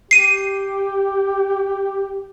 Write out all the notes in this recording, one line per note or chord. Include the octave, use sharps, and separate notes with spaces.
G4 C7 D#7